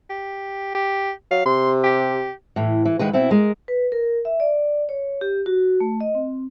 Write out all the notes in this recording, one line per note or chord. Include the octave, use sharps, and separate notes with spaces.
G4
G4
F#3 F5
C3 C6
G4
A2 E3
E3
D2 D#3 G#3 B4
B2 C4 E4
G#3 A#4
B4
A#4
E5
D5
C#5
G4
F#4
A3
D#5
C4